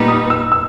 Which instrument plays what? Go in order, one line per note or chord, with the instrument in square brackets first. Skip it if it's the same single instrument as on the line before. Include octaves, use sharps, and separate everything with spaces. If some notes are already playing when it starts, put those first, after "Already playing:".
Already playing: [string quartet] A#2 G3 B3 D#4
[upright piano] D#6
E6
E6